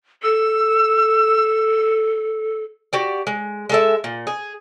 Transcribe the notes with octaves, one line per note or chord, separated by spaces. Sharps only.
A4 E6
F#4 G4 D5
G#3
G#3 A4 E5
A#2
G#4